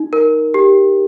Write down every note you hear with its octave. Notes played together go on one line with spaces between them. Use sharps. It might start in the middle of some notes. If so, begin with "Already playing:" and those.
Already playing: D#4
A#4
G4